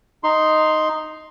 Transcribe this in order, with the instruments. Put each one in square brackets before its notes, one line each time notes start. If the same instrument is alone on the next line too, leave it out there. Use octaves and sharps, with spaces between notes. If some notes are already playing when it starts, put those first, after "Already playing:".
[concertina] D#4 C6